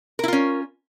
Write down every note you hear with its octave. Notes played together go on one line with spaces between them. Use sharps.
C#4 E4 F4 A#4